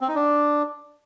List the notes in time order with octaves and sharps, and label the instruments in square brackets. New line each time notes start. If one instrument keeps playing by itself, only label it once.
[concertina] C4
D#4
D4